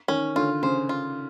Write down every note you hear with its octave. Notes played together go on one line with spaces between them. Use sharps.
D#3 C#4
D3 F4
C#3 C5
F4